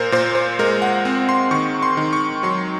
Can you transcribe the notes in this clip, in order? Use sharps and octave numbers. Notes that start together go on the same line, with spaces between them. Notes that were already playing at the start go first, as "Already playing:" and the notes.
Already playing: A#2 A#4 C5
A#2 C5
C5
G#3 A#4
F#5
C4
C6
D#3 C#6
C6
D#3
C#6
F#3 C6